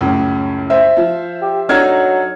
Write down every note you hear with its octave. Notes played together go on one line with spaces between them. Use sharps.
C#2 F#2 A2
C5 E5
F3
G4
F#3 D4 D#4 A4 F6 G#6